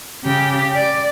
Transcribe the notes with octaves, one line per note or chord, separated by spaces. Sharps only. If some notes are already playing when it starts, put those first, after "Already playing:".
C#3 G4
D5